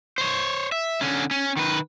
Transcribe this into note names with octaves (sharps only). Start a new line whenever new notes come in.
C5 C#5
E5
D3 C#4
C#4
D#3 B4